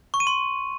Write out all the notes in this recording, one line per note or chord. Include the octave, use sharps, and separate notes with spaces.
C#6
D#7
C6